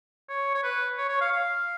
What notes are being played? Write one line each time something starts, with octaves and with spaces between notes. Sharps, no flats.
C#5
C#5
B4
C#5
C#5
F5
F5